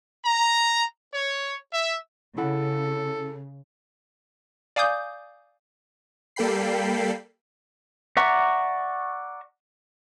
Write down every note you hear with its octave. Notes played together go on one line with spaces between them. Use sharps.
A#5
C#5
E5
C#3 E4 A4 F#5
D5 F5 G#5 D6 D#6 G6
G3 A#3 A4 G5 B5 C7
D5 E5 F#5 A#5 C#6